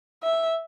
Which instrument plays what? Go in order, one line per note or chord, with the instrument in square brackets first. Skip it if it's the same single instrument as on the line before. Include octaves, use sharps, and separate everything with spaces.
[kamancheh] E5